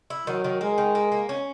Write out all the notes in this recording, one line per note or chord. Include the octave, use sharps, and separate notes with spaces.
E4
D#3 F#3
D#3
G#3 A#3
D#3
A#3
A#3
C#4